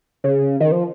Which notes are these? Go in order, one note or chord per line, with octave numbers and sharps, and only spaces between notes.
C#3
D#3
F3